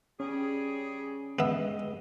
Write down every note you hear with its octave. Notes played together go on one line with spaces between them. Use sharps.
C#3 G3 C#4 G#4
G2 G#3 B3 D#5 E5